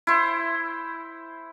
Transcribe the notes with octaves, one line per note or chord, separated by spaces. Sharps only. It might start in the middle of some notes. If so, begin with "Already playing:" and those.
E4 C5